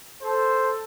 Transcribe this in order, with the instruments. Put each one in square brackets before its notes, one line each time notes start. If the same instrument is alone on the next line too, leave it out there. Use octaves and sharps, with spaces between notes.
[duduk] A4 [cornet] C5